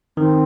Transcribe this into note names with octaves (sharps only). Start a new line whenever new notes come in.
D#3 C4